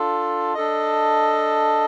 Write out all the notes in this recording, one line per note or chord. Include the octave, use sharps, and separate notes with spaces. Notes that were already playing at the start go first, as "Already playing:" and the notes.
Already playing: D4 F4 A4
D4 A4 D#5